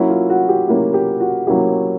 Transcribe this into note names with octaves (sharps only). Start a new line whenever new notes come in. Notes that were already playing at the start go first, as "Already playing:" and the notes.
Already playing: F#3 A#3 C#4 E4 F#4
F4
F#4
G4
F#3 A#3 C#4 E4
G4
F#4
F#3 A#3 C#4 E4 G4